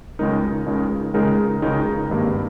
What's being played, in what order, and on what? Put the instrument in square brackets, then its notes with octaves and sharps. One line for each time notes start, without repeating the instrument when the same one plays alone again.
[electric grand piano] C#2 C#3 G#3 D#4 A#4
C#2 C#3 G#3 D#4 A#4
C#2 C#3 G#3 D#4 A#4
C#2 C#3 G#3 D#4 A#4
G#1 G2 G3 A#3